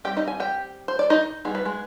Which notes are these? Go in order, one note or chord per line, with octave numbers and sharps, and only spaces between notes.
G3 C4 D#4 G4 G5
D#4 D#5
G#5
G4 G5
C5
D5
D#4 D#5
G3 B3 D#4 G#4
B4
G#3 G#4